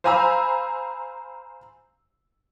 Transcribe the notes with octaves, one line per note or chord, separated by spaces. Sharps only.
C5 F5 G#5 A#5 B5 E6